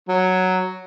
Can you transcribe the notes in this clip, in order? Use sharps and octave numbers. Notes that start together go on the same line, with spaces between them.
F#3